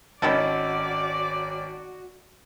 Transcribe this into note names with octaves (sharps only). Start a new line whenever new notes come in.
G#1 D#3 C#4 E4 F#4 A4 D5